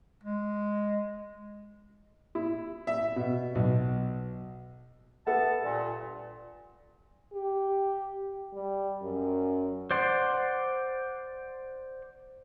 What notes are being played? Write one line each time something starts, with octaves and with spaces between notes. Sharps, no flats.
G#3
E4
E5
B2
B1
B3 A4 E5 F#5 A5
G2 A#2
G4
G3
F#2
C5 D5 F#5 C6